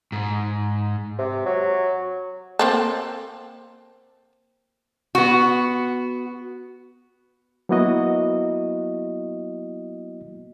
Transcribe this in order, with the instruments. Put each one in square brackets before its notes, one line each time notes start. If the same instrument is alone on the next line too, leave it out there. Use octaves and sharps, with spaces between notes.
[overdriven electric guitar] G#2
[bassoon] C3
F#3
[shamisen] A#3 C4 A4
[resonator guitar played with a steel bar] B3 F#4
[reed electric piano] F#3 A#3 B3 E4 F#4 D#5